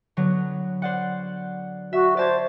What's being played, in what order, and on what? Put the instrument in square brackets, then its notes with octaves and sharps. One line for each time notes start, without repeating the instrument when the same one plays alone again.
[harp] D3 F#3 B3
C5 D5 F#5
[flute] F#4 [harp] E5
[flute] C5 [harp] D5 A5 G#6